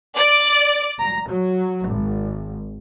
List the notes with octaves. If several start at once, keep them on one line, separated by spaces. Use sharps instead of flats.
D5
A#5
F#3
G#1